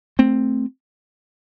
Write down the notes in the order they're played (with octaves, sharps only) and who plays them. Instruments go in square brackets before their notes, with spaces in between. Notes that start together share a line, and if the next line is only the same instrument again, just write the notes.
[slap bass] A3 C4